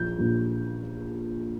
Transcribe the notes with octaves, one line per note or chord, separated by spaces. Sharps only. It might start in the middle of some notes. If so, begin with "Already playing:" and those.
Already playing: A#1 F3 G6
A#1 A#2 F3